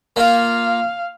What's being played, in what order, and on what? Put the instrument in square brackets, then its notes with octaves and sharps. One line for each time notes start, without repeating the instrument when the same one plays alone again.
[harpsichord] A#3 F4 [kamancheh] F5